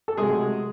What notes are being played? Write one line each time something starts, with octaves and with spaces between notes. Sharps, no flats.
A4
C3 F#3 G#3 A3 G#4